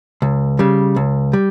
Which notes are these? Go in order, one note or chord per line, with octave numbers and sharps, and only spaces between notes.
C#2
C#3 G3
C#2
G3